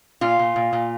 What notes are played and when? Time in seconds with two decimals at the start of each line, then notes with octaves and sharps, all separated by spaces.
0.21 A#2 F4
0.39 A#2
0.56 A#2
0.73 A#2